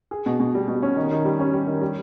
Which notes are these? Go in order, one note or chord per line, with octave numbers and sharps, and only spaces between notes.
G#4
B2
B2
G3
B2
C#4
D#3
D#3
G3
C#4
G3
D#3
G3